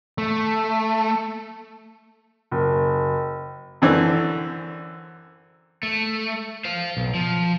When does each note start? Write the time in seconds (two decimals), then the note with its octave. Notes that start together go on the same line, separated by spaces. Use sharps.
0.18 A3
2.51 F#1
3.82 F#2 D3 E3 C4 D4
5.83 A3
6.65 C5 F5
6.97 B1
7.15 F3